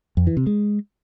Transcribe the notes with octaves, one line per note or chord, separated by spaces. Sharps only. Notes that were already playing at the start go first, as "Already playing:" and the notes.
F2
E3
C3
G#3